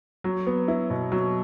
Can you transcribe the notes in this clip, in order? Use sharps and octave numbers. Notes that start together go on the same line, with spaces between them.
F#3
B3
E4
B2
F#3